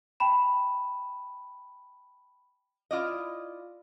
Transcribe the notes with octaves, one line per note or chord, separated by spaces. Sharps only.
G5 A5 B5 E7
E4 F4 D5 D#5